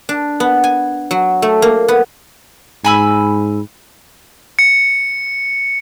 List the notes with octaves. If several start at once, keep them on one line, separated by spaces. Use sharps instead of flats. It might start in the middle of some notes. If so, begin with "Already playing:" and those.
D4
B3
G#5
F#3
A3
A#3
B3
G#2 G#5 B5 E6
C#7